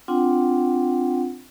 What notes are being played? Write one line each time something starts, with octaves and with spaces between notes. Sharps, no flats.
C4 D4 F4 F#5 G5